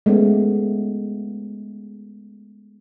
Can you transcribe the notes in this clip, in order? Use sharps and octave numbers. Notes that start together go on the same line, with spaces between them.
G#3 A3 B3 C#4